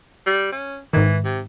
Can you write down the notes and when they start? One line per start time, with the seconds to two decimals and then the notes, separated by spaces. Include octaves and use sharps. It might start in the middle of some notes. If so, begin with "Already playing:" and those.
0.27 G3
0.52 C#4
0.93 G#2 D#3 E3
1.25 C3